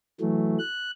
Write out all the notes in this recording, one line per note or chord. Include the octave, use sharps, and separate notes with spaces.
E3 F#3 A3
F#6